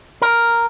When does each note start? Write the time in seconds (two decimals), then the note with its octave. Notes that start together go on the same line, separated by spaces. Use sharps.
0.22 A#4